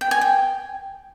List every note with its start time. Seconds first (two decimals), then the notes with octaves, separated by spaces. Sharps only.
0.01 G5
0.11 G#5
0.21 G5